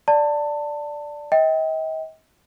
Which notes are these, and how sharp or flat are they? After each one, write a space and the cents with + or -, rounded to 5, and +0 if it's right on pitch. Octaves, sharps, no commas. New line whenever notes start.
D5 +0 A5 +20
D#5 +40 G5 +0